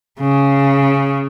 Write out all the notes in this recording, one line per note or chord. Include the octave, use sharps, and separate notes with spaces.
C#3